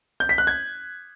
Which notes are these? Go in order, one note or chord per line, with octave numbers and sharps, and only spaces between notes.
G6
B6
F#6
G#6